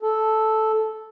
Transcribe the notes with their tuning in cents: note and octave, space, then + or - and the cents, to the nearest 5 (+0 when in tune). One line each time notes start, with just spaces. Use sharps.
A4 -5